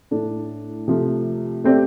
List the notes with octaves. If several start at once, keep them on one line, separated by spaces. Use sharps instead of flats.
A2 A3 D4
C3 F3 A3
A3 C4 G4 D5